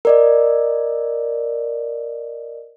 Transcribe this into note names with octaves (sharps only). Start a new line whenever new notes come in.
A#4 D5 D#5